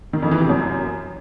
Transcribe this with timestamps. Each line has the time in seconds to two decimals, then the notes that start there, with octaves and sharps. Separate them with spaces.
0.13 D#3
0.22 F2
0.31 E3
0.40 C3
0.50 F#2